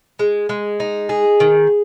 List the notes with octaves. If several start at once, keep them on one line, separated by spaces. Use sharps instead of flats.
G#3
G#3
D#4
G#4
D#3